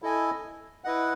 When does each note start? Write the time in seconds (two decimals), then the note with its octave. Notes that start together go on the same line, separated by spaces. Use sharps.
0.02 E4 A4 D#5 G#5
0.84 E4 B4 D#5 F#5